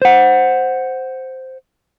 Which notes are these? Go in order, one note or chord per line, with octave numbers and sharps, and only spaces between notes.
C5 F#5